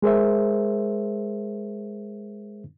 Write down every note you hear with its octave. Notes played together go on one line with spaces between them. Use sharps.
G#3 G#4 A#4 C5 E5